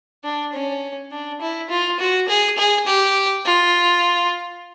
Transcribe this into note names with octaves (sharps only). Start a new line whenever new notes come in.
D4
C#4
D4
E4
F4
F#4
G#4
G#4
G4
F4